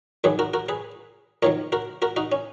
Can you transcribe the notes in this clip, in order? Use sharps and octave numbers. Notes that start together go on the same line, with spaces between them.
F#2 D#3 F#3 G#4 B4
F#4 A#4
F#4 A#4
G#4 B4
F2 D#3 F#3 A#4 C#5
F#4 A#4
F#4 A#4
D#4 F#4
C#4